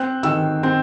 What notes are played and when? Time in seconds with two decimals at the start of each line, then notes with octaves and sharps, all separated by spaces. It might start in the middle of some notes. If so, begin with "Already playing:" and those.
Already playing: C4 F#6
0.23 D#3 E6
0.63 C4